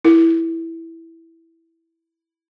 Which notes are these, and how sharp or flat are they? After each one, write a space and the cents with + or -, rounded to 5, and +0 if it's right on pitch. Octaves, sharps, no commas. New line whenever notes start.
E4 +0 A#4 +0